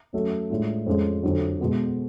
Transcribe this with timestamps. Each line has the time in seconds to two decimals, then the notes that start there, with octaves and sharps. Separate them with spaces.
0.13 F#3 A3 C#4
0.50 A2 G#3 D4 F4
0.86 F2 F3 G#3 C#4
1.23 F2 D3 F#3
1.60 B2 G#3 B3 F#4